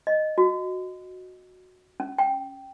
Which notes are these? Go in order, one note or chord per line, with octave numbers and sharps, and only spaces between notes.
D#5
F#4
C#4
G5